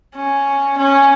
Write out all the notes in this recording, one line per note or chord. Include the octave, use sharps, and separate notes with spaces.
C#4
C#4